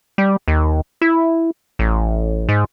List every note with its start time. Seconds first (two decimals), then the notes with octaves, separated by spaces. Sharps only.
0.18 G3
0.48 D#2
1.01 E4
1.79 A1
2.49 G#2